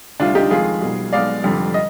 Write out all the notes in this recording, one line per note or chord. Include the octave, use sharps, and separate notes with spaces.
D2 C3 G3 D4 F4
D#4 G4
F2 D#3 G#3 F4 G#4
B1 B2 G3
B1 B2 G#3 D5 F5
F1 F2 D3 G3
D#5